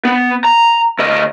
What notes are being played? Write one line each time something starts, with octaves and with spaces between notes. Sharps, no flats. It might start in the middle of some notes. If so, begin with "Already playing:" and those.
B3
A#5
D2 D#5